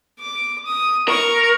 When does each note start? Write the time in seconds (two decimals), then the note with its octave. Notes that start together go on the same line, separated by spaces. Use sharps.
0.19 D6
0.66 D#6
1.08 A#4 C#6